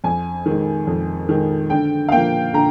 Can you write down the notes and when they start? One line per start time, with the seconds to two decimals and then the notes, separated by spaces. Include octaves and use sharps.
0.04 F2 G#5
0.46 D#3 G#3
0.87 F2
1.29 D#3 G#3
1.70 D3 G5
2.09 F5
2.12 F3 A#3 G5
2.53 D3 A#5